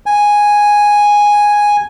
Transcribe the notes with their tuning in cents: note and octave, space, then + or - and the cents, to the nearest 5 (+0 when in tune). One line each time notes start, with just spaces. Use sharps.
G#5 -5